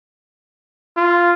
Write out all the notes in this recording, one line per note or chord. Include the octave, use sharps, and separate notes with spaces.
F4